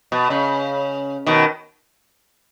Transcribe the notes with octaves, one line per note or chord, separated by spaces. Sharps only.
B2
C#3
B2 D#3